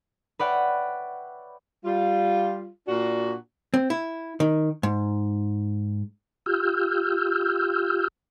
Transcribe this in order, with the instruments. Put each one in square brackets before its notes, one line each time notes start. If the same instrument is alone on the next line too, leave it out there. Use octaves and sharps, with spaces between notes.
[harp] B4 C#5 D5 E5 F#5 G5
[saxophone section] G3 F4
A#2 D4 F#4
[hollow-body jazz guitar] C4
E4
D#3
G#2
[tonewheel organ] F4 G4 E6 F6 G6